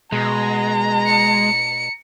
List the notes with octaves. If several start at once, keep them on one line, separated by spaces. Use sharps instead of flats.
B2 G#3 A#5
C#7